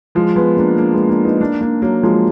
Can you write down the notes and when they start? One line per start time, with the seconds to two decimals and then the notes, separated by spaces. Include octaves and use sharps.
0.15 F3 G#3
0.36 G#3 B3
0.57 A#3 D4
0.78 A#3 D4
0.93 G#3 B3
1.09 A#3 D4
1.25 B3 D#4
1.41 A#3 D4
1.61 A#3 D4
1.82 F#3 A#3
2.03 F3 G#3